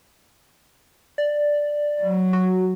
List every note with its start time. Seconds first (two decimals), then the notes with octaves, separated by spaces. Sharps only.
1.18 D5
2.01 F#3
2.33 F#4